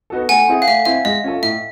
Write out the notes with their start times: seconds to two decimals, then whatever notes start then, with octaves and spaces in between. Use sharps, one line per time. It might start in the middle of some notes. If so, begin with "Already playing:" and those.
0.10 B3 D#4 F#4 A4
0.29 A3 F#5 G#5
0.48 C4 E4 G#4
0.62 F5
0.68 A3 E5
0.85 C4 E4 E5
1.05 G#3 D#5
1.24 C#4 F4 A4
1.43 A2 E5